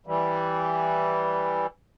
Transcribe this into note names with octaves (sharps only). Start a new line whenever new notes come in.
E3 G3